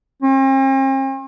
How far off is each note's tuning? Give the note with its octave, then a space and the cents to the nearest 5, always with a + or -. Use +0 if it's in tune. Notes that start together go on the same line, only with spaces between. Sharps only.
C4 +45